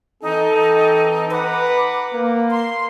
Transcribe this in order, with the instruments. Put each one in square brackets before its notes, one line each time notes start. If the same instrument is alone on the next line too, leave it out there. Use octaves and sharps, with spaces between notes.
[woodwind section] E3 C4 D#4 [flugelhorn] A4
[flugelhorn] B4 [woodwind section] F#5 A#5 D6
[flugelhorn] A#3
[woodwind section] C6